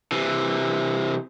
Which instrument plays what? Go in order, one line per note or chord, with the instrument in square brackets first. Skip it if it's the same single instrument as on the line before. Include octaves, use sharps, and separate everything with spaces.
[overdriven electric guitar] C3 E3